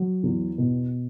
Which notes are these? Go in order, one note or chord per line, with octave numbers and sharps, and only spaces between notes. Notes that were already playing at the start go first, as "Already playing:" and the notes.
Already playing: F#3
E2
B2